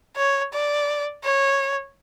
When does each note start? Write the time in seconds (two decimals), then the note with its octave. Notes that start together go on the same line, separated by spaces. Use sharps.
0.17 C#5
0.52 D5
1.24 C#5